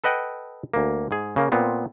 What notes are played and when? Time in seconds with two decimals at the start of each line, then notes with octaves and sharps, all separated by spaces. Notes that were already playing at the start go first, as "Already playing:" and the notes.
0.04 A4 B4 D#5 F#5 G5
0.74 D2 A#3
1.11 G#2 G#4
1.36 C#3 A#3
1.52 A#2 B3 C4